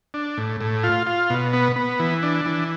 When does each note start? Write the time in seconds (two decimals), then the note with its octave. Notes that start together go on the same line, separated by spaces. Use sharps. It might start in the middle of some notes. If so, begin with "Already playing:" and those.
0.14 D4
0.37 A2
0.61 A2
0.84 F4
1.07 F4
1.30 B2
1.53 B3
1.76 B3
2.00 E3
2.23 D4
2.46 E3